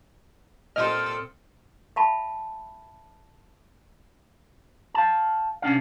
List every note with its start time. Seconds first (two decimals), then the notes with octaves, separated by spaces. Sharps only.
0.76 A#2 C4 A4 C5 D#5 D#6 F6
1.96 E5 F5 A5 B5
4.95 F5 A5
5.62 C3 C#4 D4 F5